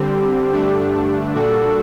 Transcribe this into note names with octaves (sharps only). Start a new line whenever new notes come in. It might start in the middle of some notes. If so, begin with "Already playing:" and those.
Already playing: D3 G3 C4 G4
G2 D3 A3 D4
A#2 G3 D4 F#4 A4